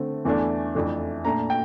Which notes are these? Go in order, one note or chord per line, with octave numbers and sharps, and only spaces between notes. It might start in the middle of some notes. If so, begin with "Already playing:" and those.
Already playing: D3 A3 C4
E2 E3 A3 D4
F2 E3 A3 D4
A#2 A3 D4 A#5
G5